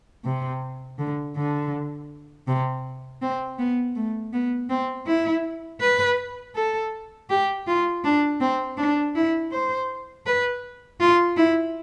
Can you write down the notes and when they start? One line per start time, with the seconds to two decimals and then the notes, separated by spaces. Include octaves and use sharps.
0.24 C3
0.99 D3
1.36 D3
2.47 C3
3.22 C4
3.59 B3
3.96 A3
4.33 B3
4.70 C4
5.07 E4
5.81 B4
6.56 A4
7.30 G4
7.67 F4
8.04 D4
8.40 C4
8.78 D4
9.15 E4
9.52 C5
10.26 B4
11.00 F4
11.37 E4